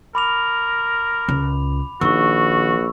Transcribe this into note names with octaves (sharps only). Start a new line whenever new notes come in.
A#4 B5 D6 F7
C#2
A#1 D#3 F#4 C#6 E6